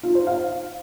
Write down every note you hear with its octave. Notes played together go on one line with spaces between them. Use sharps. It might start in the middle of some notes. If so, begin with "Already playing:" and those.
F4
C5
F5